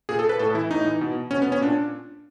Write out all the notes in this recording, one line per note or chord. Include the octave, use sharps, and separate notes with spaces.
A#2 G#4
A4
B4
A2 A4
E3 E4
A2 D#4
E3
B2
B2 C#4
B3
C#4
A#2 D4